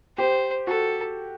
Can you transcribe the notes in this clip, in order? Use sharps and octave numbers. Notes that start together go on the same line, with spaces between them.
G4 C5
F#4 A4